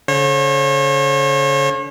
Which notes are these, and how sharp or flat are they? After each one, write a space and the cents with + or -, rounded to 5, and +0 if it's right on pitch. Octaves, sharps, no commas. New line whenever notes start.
D3 -45 C#5 -40